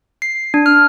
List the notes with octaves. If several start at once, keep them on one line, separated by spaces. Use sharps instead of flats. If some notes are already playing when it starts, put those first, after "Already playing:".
C7
D4
F6